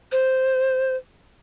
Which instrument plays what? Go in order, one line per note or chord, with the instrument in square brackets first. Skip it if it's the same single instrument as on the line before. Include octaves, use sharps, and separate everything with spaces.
[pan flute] C5